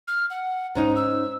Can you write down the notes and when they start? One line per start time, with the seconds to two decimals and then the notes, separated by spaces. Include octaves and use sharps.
0.08 F6
0.30 F#5
0.75 G#2 C#4 D#4 A#5
0.96 E6